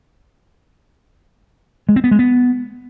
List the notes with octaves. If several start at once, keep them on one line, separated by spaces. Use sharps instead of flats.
G#3
C4
B3
G#3
B3